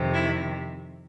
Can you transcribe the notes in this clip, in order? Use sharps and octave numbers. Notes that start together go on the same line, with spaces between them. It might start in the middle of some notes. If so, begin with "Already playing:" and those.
Already playing: F2 C3 D#3
E4